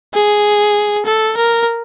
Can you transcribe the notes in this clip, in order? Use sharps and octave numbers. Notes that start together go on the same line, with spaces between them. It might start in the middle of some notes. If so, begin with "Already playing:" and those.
G#4
A4
A#4